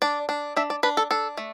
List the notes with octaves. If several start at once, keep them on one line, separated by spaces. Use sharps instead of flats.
D4 D5
D4
D4 E5
D5
D4 B4
A4
D4 A4
A3